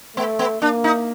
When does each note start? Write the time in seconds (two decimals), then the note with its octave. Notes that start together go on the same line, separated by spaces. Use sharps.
0.16 A3 B3
0.39 B3
0.62 A#3 D4
0.84 D#4